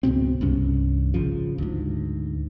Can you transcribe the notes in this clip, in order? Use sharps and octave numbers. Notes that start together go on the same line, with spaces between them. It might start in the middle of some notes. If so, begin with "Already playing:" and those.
C#2 G#2 B2 C4
C2 G2 C#4
G#1 C#3 F3
D2 G#2